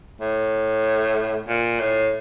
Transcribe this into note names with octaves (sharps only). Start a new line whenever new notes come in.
A2
A#2
A2